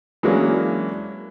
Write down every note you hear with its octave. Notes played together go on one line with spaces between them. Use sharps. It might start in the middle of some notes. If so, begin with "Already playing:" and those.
E3 F#3 G#3 A#3 C#4 D4